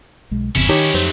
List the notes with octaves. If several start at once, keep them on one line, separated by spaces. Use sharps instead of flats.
B1 G#3
G1 E2 C3 C#4 E4
D#3 D#4 G4 C#5
F2 F#3 A3 C5